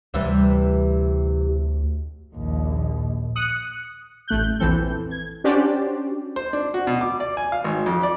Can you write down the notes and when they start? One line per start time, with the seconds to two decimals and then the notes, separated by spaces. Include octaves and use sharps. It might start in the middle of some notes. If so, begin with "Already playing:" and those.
0.14 D2 C3 E3 G3
2.36 A#1 D#2
3.36 D#6 F#6 C#7
4.28 A1 A3 F#6 G6
4.59 A#1 E2 E3 C4 A4 G6
5.11 G#6
5.44 C#4 D4 F#4 G4 C5 D5
6.36 C5
6.53 D4
6.74 F#4
6.87 B2
7.01 D6
7.20 D5
7.37 G#5
7.52 F5
7.64 G#1
7.86 F2
8.03 D5